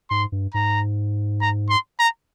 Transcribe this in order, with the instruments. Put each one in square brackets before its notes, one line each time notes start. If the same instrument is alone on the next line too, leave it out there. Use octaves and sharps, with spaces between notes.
[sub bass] G#2 [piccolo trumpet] C6
[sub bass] G2
[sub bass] G#2 [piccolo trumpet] A#5
[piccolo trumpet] A#5
C6
A#5